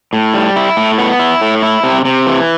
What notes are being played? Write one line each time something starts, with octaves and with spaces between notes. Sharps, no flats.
A2
G3
E4
A2
B3
E4
A2
E4
C3
C3
E3